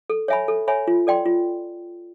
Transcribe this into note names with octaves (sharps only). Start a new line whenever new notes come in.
A4
C#5 E5 G#5 B5
A4
C#5 E5 G#5 B5
F4
A4 D5 G5 C6
F4